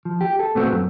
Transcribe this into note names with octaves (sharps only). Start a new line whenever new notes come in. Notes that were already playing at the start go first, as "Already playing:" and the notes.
F3
G4
A4
A#2 D3 A3 B3 C4 F#4
F#2